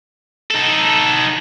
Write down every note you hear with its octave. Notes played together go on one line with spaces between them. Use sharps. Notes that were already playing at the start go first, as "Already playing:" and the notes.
D#4 A4